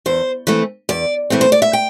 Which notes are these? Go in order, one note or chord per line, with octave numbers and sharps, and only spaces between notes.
E2 C5
E3 A3 C4
E2 D5
E3 A3 C4
C5
D5
E5
G5